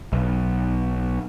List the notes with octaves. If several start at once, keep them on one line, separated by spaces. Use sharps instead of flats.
B1